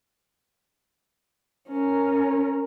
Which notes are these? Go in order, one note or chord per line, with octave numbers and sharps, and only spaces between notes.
C#4 A#4